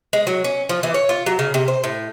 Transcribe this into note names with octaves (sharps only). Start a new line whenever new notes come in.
G#3
F#3
C#4
F3
E3
C#5
F4
F#3
C#3
C3
C5
A2